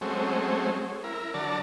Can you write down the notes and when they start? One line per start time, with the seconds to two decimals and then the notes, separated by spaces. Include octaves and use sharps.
0.01 F#3 G#3 A3 C4 C#4
1.04 E4 A#4
1.34 D3 F#3 D5 A5 A#5